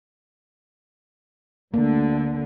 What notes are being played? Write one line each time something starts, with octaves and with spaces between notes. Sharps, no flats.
D2 D3 A#3